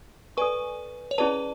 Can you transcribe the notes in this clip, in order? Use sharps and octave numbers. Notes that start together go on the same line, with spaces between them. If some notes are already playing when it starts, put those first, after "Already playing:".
A4 B4 D5 G#5 C#6
C#5
C#4 E4 G#4 B4 D5 A5